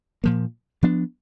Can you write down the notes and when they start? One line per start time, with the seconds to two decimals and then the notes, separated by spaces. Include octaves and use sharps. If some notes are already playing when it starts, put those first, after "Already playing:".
0.24 A#2 F3 A#3
0.83 F3 B3 D4